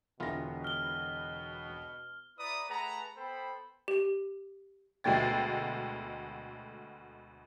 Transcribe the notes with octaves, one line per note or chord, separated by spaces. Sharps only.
E1 B2 D3 E3 B3 F4 A#6
F6 G7
E4 B4 D5 A#5 B5 D#6
A3 G#4 B4 F#5 A5 A#5
B3 A4 C5 G5 B5
G4
D2 B2 G#3 A3 G5 A6